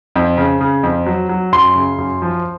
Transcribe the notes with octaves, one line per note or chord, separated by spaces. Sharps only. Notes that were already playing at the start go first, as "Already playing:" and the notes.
F2
C#3
C#3
F2
F#3
F#3
F#2 C6
C#3
F#2
F3